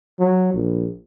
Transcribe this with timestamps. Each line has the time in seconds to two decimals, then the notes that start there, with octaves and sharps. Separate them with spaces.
0.20 F#3
0.54 A#1